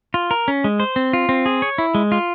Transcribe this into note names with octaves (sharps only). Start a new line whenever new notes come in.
F4
A#4
C#4
G#3
C5
C4
F4
C4
G#4
C#5
E4
G#3
F4